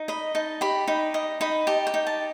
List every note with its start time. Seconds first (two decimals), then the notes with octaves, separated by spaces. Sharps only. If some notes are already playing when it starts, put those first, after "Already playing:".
Already playing: D#4
0.08 D#5 B5
0.35 D#4 A5
0.61 G4 B5
0.88 D#4 B5
1.14 D#5
1.41 D#4 B5
1.67 G4 A5
1.87 G5
1.94 D#4
2.07 A5